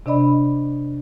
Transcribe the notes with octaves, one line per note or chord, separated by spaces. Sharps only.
C3 D4 D5 D#5 B5